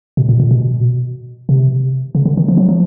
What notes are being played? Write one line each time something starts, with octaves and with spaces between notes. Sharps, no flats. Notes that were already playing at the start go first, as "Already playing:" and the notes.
B2
A#2
A#2
B2
C3
C#3
D3
D#3
F3
F#3
F3